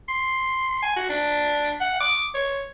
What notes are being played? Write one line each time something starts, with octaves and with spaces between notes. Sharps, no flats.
C6
G#5
F#4
D4
F#5
D6
C#5